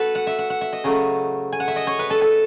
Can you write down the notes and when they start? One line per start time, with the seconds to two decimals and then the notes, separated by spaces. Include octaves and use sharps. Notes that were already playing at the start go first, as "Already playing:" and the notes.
Already playing: A3 F#4 A4 B4
0.15 F#5
0.27 E5
0.38 F#5
0.50 F#5
0.61 E5
0.73 D#5
0.84 C#3 F#3 A3
1.52 G#5
1.60 F#5
1.68 E5
1.76 D#5
1.87 C#5
1.99 B4
2.10 A4
2.22 A4